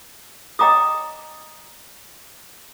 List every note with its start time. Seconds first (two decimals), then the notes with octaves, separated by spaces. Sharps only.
0.59 D#5 G5 A#5 D6 D#6